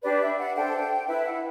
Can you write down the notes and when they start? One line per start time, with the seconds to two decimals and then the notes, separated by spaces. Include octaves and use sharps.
0.03 D4 G4 B4 D5
0.21 E5
0.38 F#5
0.55 D4 A4 C5 G5
1.07 E4 B4 E5
1.25 F#5